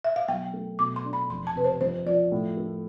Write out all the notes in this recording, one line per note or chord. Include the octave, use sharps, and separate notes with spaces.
E5
F5
B1 G5
A3
B2 D6
C6
D4
B5
F1 C6
A5
C3 B4
C5
F2 C5
F3 D5
A2
A3